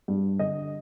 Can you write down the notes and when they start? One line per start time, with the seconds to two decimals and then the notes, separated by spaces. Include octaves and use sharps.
0.08 G2
0.39 D3 D#5